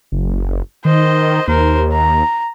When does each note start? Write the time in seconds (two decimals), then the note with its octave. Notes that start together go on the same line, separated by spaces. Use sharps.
0.12 F#1
0.85 D#3 C5 D#5
1.48 D#2 A#4 C5
1.92 A#5